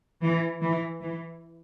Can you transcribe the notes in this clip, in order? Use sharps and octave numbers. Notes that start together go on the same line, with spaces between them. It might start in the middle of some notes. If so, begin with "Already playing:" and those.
E3
E3
E3